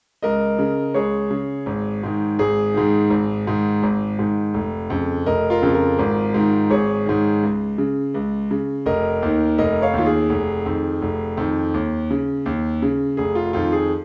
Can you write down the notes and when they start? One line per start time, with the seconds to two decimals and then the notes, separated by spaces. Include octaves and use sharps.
0.23 C#2 A#4 D#5
0.59 C#3
0.94 C#2 G#4 C#5
1.30 C#3
1.66 G#1
2.03 G#2 D#3
2.39 G#1 G#4
2.74 G#2 D#3
3.10 G#1
3.47 G#2 D#3
3.83 G#1
4.19 G#2 D#3
4.54 F1
4.90 F2 C#3
5.26 F1 A#4 D#5
5.50 F4 A#4
5.62 F2 C#3
5.74 F4 A#4
5.99 G#1
6.34 G#2 D#3
6.70 G#1 G#4 C#5
7.06 G#2 D#3
7.43 C#2
7.78 C#3
8.14 C#2
8.51 C#3
8.86 F1 A#4 D#5
9.22 D#2 D#3
9.58 F1 A#4 D#5
9.82 C#5 F5
9.94 D#2 D#3 F4
10.06 G#4
10.29 F1
10.66 F2 D#3
11.02 F1
11.37 F2 D#3
11.74 D#2
12.11 C#3
12.46 D#2
12.82 C#3
13.17 F1 G#4
13.35 F4
13.53 F2 D#3 F4
13.72 G#4